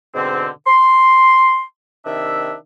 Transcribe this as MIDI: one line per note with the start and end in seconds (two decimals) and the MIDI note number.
0.15 0.49 44
0.15 0.49 47
0.15 0.49 50
0.15 0.49 60
0.67 1.61 84
2.05 2.54 48
2.05 2.54 51
2.05 2.54 62
2.05 2.54 76